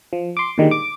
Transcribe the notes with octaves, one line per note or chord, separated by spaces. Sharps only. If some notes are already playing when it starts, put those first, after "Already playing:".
F3
C6 D6
A#2 D3 D#3 G3 G#3
D6